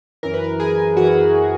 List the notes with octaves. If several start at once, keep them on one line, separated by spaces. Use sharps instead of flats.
F#2 E3 A#4
B4
A#4
G#4
F#2 E3 F#4